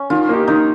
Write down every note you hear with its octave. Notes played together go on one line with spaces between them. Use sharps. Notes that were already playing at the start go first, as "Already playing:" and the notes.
Already playing: C#4
D#3 F4
A#3 D#4 G4
D#3 D#4